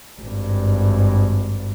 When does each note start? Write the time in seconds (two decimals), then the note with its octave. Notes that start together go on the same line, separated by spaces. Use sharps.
0.20 G#1 G2